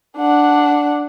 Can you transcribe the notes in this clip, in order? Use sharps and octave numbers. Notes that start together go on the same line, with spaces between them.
D4 F#5